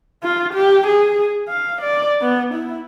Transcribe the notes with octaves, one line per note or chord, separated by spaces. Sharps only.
F4
G4
G#4
F5
D5
B3
E4